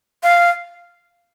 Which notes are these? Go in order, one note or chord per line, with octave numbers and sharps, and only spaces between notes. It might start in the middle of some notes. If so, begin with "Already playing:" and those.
F5